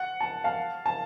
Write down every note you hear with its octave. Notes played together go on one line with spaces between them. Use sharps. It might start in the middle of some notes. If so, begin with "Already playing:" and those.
Already playing: F#5
A5
F5 A5
A5